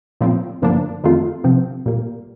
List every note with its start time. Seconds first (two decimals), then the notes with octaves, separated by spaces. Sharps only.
0.21 A#2 F3 C4
0.62 G2 D3 F3 A#3 D4
1.04 F2 D#3 A3 C4 F4
1.44 C3 F3 C4
1.86 A#2 G3 A#3